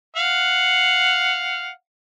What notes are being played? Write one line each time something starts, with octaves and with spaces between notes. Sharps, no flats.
F5 F#5